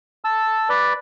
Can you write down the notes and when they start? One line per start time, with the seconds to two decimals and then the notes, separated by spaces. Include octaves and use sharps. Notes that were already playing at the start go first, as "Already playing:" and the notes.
0.24 A5 E6
0.69 B4 D5